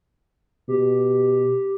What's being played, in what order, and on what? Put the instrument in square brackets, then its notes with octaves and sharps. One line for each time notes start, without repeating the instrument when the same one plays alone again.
[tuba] B2 [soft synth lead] G4